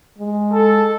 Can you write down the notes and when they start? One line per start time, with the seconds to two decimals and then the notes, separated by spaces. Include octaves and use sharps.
0.18 G#3
0.53 A4